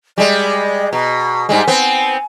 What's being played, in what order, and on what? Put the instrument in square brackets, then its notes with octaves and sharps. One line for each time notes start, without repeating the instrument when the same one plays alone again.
[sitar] G3 G#3 [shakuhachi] D5
[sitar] B2 [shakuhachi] A#5
[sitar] G#2 G3 G#3 [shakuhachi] G#5
[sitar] B3 C4